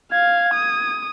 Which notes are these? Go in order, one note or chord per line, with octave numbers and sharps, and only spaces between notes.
F5 G#6
D#6